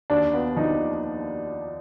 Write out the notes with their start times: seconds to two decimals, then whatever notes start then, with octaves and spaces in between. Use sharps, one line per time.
0.10 D#2 D4
0.34 B3
0.56 F3 D#4